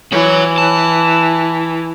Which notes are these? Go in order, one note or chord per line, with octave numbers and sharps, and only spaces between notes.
E3 F#4 C#5
A5